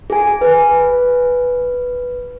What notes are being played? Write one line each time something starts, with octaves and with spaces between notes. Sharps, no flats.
G#4 G#5
B4